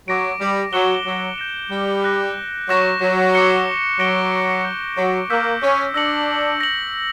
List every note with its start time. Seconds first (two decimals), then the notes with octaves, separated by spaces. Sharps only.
0.08 F#3 D6 A#6 D7
0.41 G3
0.73 F#3 F#6 C#7 E7 G7
1.06 F#3
1.38 G6 A#6 E7
1.70 G3
2.04 F#6 A#6 C#7 G7
2.69 F#3 C#6 F#6 A#6 E7
3.01 F#3
3.34 D6 F#6 C#7 G7
3.99 F#3 A#6 D7 G7
4.65 G6 C#7 G7
4.97 F#3
5.30 A#3 E6 G6 B6 E7
5.63 C#4
5.94 D4 E6 A#6 C#7 F#7
6.61 A#6 C#7 F#7